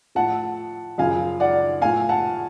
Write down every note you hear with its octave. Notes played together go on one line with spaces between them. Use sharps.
A2 F3 F#5 A5
F#2 C#3 F3 F5 G#5
D5 F#5
A2 F3 F5 G#5
F#5 A5